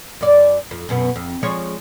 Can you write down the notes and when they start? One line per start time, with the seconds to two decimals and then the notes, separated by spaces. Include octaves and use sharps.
0.21 F#2 D5
0.71 F2
0.89 F#2 B2 B3
1.16 F2
1.43 F3 G#3 C#5